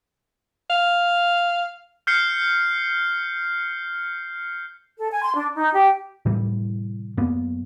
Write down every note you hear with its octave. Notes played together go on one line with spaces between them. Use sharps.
F5
F6 G6 C7 C#7 G7
A4
G#5
C6
D4
D#4
G4
A2 C3 E3 G3
F#2 A#3 B3